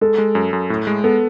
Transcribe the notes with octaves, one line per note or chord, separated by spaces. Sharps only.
G#3 A4
G#3
F#2
F#2
A2
G#3
B3 A4